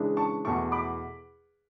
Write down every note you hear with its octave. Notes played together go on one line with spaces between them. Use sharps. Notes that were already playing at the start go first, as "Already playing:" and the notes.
Already playing: C#3 E3 G#3 D4
A5 C#6
E2 B2 A3 A5 C#6
B5 D6